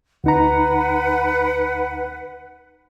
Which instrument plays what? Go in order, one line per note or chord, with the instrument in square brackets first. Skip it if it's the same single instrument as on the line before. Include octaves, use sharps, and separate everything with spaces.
[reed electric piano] D2 D#4 A#5 [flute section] B4 F#5